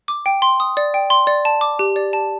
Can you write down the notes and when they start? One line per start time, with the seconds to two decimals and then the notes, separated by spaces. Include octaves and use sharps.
0.08 D6
0.26 G5
0.42 C6
0.60 D#6
0.77 D5
0.94 G5
1.10 C6
1.27 D5
1.45 A5
1.61 D6
1.79 G4
1.96 D5
2.13 A5